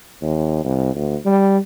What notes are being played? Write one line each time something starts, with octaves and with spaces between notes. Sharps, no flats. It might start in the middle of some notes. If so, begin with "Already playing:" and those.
D#2
C2
D2
G3